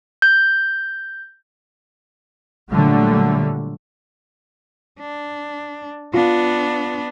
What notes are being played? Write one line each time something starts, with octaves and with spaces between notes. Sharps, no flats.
G6
A#2 D3 F#3 G3 A3
D4
B3 D4 F4